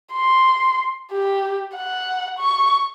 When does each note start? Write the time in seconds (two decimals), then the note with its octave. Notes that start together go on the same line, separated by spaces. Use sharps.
0.14 C6
1.12 G4
1.76 F#5
2.39 C#6